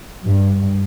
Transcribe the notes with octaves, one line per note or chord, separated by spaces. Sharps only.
G2